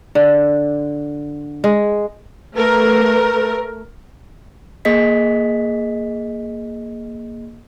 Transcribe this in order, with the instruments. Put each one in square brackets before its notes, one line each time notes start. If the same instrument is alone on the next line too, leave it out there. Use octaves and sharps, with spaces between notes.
[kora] D3
G#3
[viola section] A3 A#4 [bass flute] B4
[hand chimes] A#3 G#4 D#5 B6